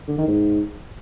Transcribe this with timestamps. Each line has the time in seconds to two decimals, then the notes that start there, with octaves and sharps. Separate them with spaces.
0.08 D3
0.18 D#3
0.28 G#2